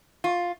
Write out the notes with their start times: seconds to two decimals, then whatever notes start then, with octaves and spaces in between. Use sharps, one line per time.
0.24 F4